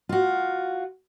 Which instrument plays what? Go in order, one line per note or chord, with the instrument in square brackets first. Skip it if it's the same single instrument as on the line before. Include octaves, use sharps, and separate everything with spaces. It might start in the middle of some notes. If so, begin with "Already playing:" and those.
[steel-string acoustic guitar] F4 F#4